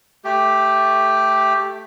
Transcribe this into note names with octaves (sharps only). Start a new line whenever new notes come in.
A3 G4